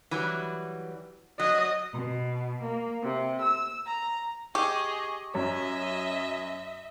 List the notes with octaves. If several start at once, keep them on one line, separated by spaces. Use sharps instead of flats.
E3 F#3 G3
F#3 D#5
B2
A#3
C3
E6
A#5
G4 G#4 D#5 C#6 D6
F#2 C#5 D#5 E5